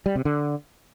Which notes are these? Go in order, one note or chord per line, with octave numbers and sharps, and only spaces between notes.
G3
C3
D3